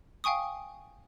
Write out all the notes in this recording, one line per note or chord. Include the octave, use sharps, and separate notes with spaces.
F5 G5 G#5 C#6 D#6